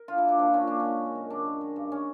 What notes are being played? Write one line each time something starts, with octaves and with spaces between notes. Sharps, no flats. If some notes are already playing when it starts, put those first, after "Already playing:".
Already playing: A#4
D3 F4
E4
A#3 D4
F3 D4
A#2 C#4
A#2 D4
G#3 C#4
D#3
F#2
F#2 D4
G#3
D#3
G2
C#4